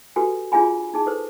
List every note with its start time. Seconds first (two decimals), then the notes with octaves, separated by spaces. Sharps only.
0.16 F#4 G4 A4 B4 G#5
0.52 D4 F4 G#4 F5 G#5 B5
0.94 D#4 G#4 A5
1.06 A4 B4 C5